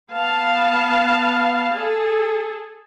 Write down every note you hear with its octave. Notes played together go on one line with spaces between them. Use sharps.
B3 F5 A5
G#4 A4